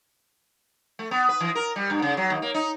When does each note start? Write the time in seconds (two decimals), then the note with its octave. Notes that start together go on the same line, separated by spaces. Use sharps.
0.99 A3
1.11 B3
1.29 B4
1.40 E3
1.55 A#4
1.76 G3
1.90 G2
2.02 C#3
2.17 F#3
2.30 D#2
2.42 A#3
2.54 D#4